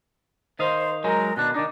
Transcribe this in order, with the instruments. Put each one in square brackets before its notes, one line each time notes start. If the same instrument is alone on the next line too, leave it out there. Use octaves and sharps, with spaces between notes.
[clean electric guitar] D#3 D#5 F5 [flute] C5
[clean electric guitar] F#3 G#3 D#4 [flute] A#4
[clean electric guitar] B2 D#3 D4 [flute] F#6
[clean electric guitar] D#3 D#4 [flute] D4